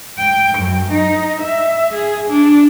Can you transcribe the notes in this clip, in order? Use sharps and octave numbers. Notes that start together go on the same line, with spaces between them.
G5
F#2
D#4
E5
G#4
D4